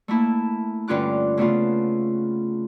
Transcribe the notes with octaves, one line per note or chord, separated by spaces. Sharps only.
A3 A#3 E4 A5
G2 D3 C#4 F4 D6 F#6
C#3 A3 B3 F4